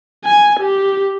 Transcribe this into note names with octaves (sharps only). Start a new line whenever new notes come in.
G#5
G4